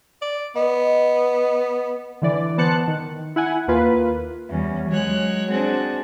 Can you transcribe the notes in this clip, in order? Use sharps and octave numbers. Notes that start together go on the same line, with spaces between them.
D5
B3 D#5
D3 E3 D5
B3 C5 A5 F#6 C#7
D#3
E4 F#5 G#5
D#2 A#3 F4 B4
E2 G3 C#4
F#3 G#3 C#5 F#6
C4 D4 F#4 G#4